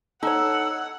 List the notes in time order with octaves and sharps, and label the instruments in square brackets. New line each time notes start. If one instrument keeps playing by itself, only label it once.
[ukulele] D#4 C#5 [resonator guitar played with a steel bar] A4 [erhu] F#5 [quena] E6